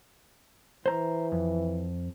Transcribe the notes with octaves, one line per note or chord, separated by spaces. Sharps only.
E3 C5 A#5
F2